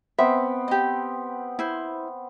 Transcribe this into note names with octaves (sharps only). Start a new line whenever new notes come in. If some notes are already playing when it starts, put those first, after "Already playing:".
B3 C4 E5
G4 D#5
E4 C5